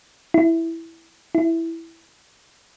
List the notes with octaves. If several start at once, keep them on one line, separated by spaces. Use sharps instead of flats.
E4
E4